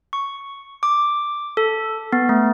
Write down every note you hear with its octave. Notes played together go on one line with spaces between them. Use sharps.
C#6
D6
A4
B3
A3